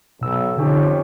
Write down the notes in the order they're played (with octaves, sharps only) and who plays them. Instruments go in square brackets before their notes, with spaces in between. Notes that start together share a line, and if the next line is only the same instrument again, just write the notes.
[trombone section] B1 [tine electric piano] B2 E6
[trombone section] F2 C#4 G4 [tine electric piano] D3 D#4